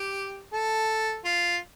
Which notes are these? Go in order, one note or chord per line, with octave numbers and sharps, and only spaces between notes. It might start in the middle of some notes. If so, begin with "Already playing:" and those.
Already playing: G4
A4
F4